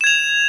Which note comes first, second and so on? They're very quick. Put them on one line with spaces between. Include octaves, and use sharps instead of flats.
E7 G#6 F7